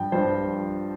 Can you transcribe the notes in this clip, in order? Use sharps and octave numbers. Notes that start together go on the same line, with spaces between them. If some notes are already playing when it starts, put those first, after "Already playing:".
Already playing: G2 F3 G5
G2 F3 C5